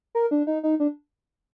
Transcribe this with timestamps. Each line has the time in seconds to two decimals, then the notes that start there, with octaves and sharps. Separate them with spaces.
0.15 A#4
0.31 D4
0.47 D#4
0.63 D#4
0.80 D4